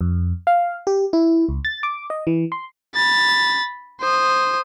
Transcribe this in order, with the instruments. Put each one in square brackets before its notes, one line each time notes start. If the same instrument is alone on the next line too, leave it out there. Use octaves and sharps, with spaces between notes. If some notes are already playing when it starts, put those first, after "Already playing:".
[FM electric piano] F2
F5
G4
E4
C#2
A6
D6
D#5
E3
C6
[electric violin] B5 A6
C5 D#6